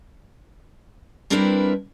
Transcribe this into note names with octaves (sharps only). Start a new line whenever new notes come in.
G3 C4 D4 E4 A#4 B4